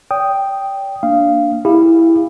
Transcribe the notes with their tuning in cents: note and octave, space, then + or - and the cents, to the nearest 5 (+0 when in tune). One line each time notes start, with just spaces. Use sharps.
D5 -45 G5 +0 D#6 +0
A#3 +0 D4 +0 F5 -15
E4 +0 G4 +35 F5 +0